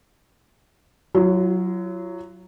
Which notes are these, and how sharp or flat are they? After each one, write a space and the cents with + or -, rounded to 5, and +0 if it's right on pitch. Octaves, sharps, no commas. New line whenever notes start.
F#3 +0 F4 -45